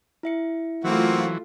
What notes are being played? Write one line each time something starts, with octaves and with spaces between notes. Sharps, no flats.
E4 E5 C#7
E3 F#3 A3 A#3 C4 F4 F#4